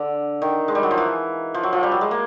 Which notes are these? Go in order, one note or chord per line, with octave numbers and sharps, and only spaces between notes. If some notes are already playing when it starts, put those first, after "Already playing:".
Already playing: D3
D#3
G#3
G3
F#3
F3
E3
F3
F#3
F3
G3
F#3
G#3
A#3